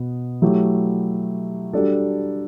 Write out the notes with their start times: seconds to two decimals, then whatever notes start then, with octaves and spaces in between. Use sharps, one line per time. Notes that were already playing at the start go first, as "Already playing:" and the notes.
Already playing: B2 B3
0.42 F#3 A3 E4 G4
1.73 G3 D4 F#4 A4